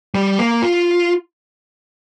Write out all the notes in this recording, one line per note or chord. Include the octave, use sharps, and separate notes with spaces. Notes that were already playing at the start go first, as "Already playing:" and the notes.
G3
A#3
F4